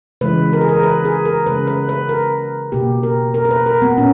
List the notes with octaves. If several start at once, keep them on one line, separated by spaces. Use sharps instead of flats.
C#3 E3 G#3 B4
A#4
G#4
A#4
B4
G#4
A#4
C#3 G#3 B4
B4
B4
A#4
B2 A#3 G4
A#4
A#4
A#4
B4
A#4
B3
A#2 C#4